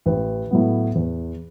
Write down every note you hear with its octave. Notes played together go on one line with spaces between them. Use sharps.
A1 B4
A2 F#3 B3
E2